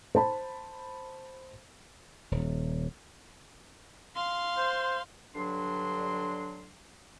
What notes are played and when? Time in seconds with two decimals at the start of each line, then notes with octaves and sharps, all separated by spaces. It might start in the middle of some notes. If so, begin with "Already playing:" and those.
0.15 C5 A5 B5
2.31 D#1
4.16 F5 C6
4.58 C5
5.35 G2 D3 F#3 D4 C6